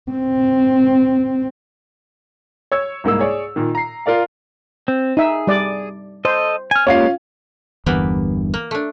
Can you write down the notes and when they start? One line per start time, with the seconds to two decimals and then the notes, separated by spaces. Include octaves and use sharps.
0.12 C4
2.72 C#5 E6 G#6
3.04 C2 G#2 A#3 E6
3.19 G#4 C#5 D5
3.56 A#2 D#3
3.75 A#5 C7
4.06 F4 A#4 D5 F5
4.88 C4
5.17 D#4 G#4 E5
5.47 G3 D5
6.25 A4 C5 D#5
6.71 G#5 F6
6.87 G#3 A#3 C#4 F4 G4 F5
7.86 G1 E2 G2 E3 A#3 B3
8.54 A#3
8.71 A3 D4